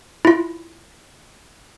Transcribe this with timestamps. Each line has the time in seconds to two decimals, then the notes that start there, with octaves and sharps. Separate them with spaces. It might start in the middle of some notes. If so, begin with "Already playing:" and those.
0.25 E4 F4